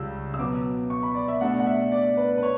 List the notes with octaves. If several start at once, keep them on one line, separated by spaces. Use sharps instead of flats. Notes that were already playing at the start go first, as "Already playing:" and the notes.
Already playing: C#2 C#3 G3 C#4 E6
E6
B2 F#3 B3 D6
C#6
B5
D5
E5
B2 A3 D4 F#5
F#5
E5
D5
B4
B4
C#5